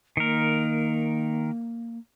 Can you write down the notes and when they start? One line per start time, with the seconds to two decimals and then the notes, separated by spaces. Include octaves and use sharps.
0.17 D#3 A#3 A#4